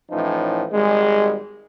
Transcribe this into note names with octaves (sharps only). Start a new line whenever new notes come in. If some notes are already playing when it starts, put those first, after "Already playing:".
A2 E3 F3 C#4 D#4
G#1 G3 G#3